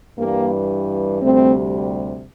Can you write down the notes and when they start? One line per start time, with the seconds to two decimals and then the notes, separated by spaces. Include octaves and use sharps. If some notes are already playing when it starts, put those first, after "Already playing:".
0.18 G2 E3 G3 A#3
1.21 D2 C3 G3 A3 C4